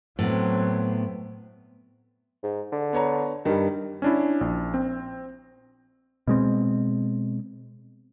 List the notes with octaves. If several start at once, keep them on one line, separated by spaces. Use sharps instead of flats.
A2 F#3 B3 C4
G#2
D3
B3 C#5 A#5
G2 D#3 G3
C#4 D4 E4
A#1
C4
B2 G#3 C4